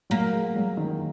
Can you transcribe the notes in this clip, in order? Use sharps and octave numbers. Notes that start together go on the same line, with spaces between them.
F#3 A#3
G#3
F#3
D#3